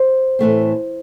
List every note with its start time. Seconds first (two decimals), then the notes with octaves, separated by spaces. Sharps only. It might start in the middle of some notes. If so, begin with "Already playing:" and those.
Already playing: C5
0.39 A2 E3 A3 C4